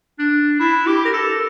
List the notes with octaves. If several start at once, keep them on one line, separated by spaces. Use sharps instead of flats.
D4
E4
G4
A#4
A4